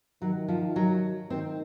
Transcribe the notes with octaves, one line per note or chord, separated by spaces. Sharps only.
D#3 F#3
F3
F#3
D#3 C4